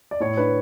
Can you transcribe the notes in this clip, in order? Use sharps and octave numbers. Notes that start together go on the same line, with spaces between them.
D5
A2 C#5
D4 B4